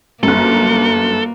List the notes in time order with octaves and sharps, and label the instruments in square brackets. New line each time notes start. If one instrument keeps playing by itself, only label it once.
[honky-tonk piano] G1 F#2 [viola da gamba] A#3 [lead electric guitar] A4